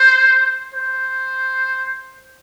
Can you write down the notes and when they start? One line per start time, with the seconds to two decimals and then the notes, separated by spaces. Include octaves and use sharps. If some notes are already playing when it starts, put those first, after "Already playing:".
Already playing: C5
0.74 C5